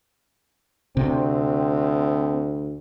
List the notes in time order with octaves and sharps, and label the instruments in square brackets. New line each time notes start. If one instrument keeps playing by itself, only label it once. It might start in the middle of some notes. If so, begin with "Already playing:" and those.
[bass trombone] D2 [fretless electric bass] C3 [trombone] C4